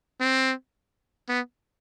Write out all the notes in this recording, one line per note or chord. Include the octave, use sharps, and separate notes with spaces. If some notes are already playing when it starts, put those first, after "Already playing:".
C4
B3